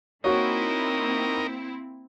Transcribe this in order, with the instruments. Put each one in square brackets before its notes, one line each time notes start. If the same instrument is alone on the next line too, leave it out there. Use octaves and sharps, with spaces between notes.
[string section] A#3 C4 E4 [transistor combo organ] D#4 A#4 [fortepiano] F#4 C#5